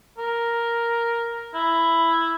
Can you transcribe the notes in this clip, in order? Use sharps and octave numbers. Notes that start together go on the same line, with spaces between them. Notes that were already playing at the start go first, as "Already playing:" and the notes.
A#4
E4